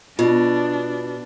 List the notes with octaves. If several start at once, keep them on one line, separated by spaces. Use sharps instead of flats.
B2 D4 F4